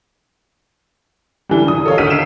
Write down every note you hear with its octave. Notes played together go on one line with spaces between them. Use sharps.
D3 E3 G3
F1 D#6
A4 A#4 C#5 D#5 F5
D2 D#3 E6 F6 B6 D#7
E6 F6 C7 D7 E7